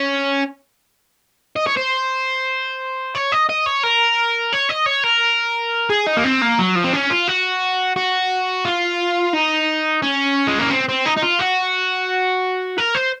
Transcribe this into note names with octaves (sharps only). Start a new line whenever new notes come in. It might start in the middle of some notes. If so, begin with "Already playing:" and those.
Already playing: C#4
D#5
C#5
C5
C#5
D#5
D#5
C#5
A#4
C#5
D#5
C#5
A#4
G#4
D#4
A#3
C4
A#3
F#3
F3
C4
C#4
F4
F#4
F#4
F4
D#4
C#4
G#3
A#3
C4
C4
D#4
D#4
F4
F#4
A#4
C5